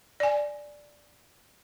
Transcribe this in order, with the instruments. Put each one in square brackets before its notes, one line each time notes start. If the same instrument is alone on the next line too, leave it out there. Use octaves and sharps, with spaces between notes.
[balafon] D5 G#5